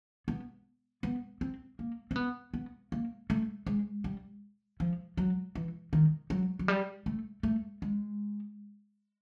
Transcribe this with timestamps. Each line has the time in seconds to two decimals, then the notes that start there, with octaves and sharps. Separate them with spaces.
0.28 B3
1.03 B3
1.41 C4
1.79 A#3
2.11 C4
2.16 B3
2.54 B3
2.92 A#3
3.30 A3
3.66 G#3
4.04 G3
4.80 F3
5.17 F#3
5.55 E3
5.93 D#3
6.30 F#3
6.59 F#3
6.68 G3
7.06 A3
7.43 A3
7.82 G#3